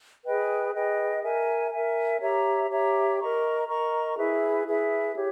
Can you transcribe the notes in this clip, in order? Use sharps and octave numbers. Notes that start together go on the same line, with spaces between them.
G#4 B4 D#5 G5
G#4 B4 D#5 G5
A#4 E5 G#5
A#4 E5 G#5
G4 C#5 E5 A#5
G4 C#5 E5 A#5
A#4 D#5 A#5 C#6
A#4 D#5 A#5 C#6
E4 G#4 B4 E5
E4 G#4 B4 E5
G4 C#5